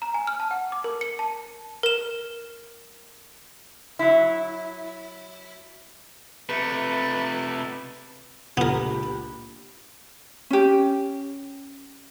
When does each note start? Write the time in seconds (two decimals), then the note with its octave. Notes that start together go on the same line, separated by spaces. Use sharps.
0.02 A#5
0.14 G#5
0.27 F6
0.40 A5
0.51 F#5
0.72 D6
0.84 A#4
1.01 C#7
1.19 A5
1.83 A#4 E7
3.99 F#3 E4
6.49 C3 A3 B4
8.57 C#2 A#2 B3 D4 G4 A#4 B5
10.51 C#4 G4